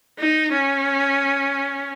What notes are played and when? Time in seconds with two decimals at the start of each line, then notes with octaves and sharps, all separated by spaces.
0.19 D#4
0.53 C#4